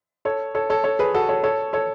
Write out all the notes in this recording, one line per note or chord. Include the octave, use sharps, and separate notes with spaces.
A4 C#5
A4 C#5
A4 C#5
A4 C#5
G#4 B4
F#4 A4
A4 C#5
A4 C#5
A4 C#5